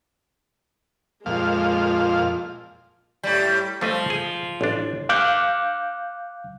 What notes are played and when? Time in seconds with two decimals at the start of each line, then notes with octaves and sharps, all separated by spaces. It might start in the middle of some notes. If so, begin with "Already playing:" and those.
1.26 F2 A#2 G#3 F4 F5
3.23 A2 G3
3.81 F3 G3 A3 D#5
4.10 G#4
4.61 A1 D4
5.09 F5 D6 F#6 G6